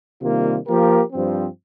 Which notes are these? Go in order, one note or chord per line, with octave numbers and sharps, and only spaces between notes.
C3 D#3 G3 A#3 F4
F3 A#3 G4 A#4
G2 F3 C4